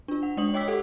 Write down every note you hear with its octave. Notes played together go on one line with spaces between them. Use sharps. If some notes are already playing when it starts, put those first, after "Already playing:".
D4 F4
F#5
G#3 D4 D5 D#6 F#7
C#5 D#5 G5 D6 E6 B6
G4 A4 F#5